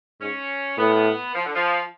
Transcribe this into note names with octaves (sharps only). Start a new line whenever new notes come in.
G#2 C#4
A2 B3
F3
D3
F3